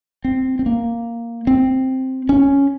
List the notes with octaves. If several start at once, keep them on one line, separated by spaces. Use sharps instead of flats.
C4
C4
A#3
C4
C#4